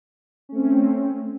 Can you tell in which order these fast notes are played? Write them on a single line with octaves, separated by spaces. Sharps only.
C#4 A3 C4